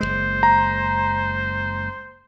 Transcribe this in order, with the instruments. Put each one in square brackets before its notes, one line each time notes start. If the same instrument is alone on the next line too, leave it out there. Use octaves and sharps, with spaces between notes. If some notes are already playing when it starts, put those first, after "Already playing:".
[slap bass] F#1 E2 G#3 [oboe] C5
[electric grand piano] A#5